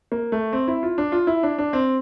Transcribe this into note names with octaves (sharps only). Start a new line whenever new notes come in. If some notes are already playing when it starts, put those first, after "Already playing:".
A#3
A3
C4
E4
F4
D4
F4
E4
D4
D4
C4